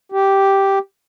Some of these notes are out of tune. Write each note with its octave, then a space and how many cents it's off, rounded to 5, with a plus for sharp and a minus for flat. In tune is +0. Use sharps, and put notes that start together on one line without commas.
G4 -5